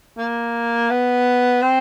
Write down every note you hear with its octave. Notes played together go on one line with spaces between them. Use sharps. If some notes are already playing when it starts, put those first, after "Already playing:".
A#3
B3
C4